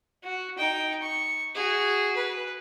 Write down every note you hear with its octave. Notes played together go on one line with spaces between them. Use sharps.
F#4
D#4 G5
C#6
F#4 G#4
B4